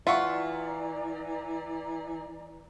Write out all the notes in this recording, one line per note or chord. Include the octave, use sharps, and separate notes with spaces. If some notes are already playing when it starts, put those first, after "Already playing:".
E3 F4 D5 E5 F#5 A#5 C#6